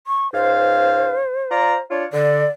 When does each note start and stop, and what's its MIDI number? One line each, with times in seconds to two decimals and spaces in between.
0.07 0.32 85
0.33 1.17 37
0.33 1.17 44
0.33 1.80 72
0.33 1.17 77
1.50 1.76 65
1.50 1.76 74
1.50 1.76 82
1.90 2.05 62
1.90 2.05 65
1.90 2.05 73
2.13 2.44 50
2.13 2.50 74